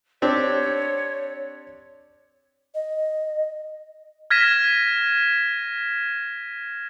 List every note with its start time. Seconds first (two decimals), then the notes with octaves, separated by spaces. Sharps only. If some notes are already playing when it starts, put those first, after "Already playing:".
0.22 C4 D4 G4 C#5
2.75 D#5
4.30 F6 G#6 A#6 B6 D#7 E7